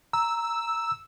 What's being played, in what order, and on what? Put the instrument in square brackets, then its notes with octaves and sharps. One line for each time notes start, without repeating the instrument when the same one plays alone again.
[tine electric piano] A#5 [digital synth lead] E6